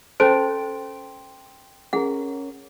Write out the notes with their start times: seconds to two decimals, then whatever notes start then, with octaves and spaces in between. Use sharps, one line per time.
0.20 C#4 A4 C5 G5 C6 D7
1.93 C#4 G#4 A#4 F#5